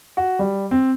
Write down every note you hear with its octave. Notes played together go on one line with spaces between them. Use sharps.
F#4
G3
C4